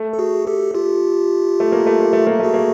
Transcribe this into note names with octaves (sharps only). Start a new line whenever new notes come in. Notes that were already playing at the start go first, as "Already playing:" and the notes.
Already playing: A3
A4
F#4 G#4
G4 A4
F4 G4
A3
A#3
A3
A#3
A3
A#3
A3 F#4 G#4
A#3